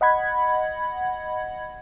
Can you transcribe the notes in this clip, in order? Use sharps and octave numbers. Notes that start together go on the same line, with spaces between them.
D#5 F#5 B5 G#6